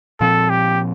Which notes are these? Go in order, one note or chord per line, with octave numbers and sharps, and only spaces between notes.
A#2 F3 C4 A4
G4